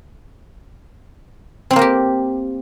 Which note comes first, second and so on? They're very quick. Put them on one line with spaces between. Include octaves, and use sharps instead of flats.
C4 C5 A#3 A#4 G4